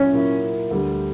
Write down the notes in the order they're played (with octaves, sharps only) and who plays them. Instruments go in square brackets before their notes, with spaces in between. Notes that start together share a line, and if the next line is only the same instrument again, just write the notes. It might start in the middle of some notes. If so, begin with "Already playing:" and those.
Already playing: [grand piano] A#2 F#3 A#3 E4 [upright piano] C#4
[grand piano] A#2 F#3 A#3 E4
D2 D3 G3